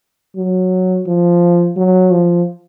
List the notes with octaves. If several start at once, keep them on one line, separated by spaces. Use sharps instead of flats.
F#3
F3
F#3
F3